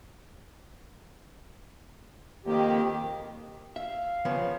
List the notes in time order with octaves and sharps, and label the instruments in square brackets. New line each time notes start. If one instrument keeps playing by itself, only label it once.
[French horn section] F2 D#3 [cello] A#3 [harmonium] G4
[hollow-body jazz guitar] E5 [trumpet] F5
[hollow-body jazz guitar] C#3 F3 B3